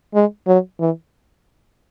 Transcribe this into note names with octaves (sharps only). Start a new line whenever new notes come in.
G#3
F#3
E3